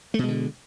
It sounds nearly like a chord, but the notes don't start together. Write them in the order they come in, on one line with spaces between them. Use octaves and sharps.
A3 B2 G#3 D3